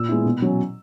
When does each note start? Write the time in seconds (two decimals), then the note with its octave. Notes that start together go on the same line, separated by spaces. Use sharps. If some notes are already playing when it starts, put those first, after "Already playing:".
Already playing: A#2 E6
0.09 G#3 B3 E4
0.25 B2
0.42 F#3 C#4